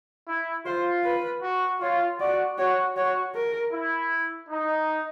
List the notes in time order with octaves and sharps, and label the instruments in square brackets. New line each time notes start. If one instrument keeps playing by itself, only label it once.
[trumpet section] E4
[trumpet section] F4 [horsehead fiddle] C5
[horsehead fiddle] B4
[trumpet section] F#4
[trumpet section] F4 [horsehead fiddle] C#5
[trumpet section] F#4 [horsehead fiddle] D5
[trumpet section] F#4 [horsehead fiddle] C#5
[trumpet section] F#4 [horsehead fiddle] C#5
[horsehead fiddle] A#4
[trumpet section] E4
D#4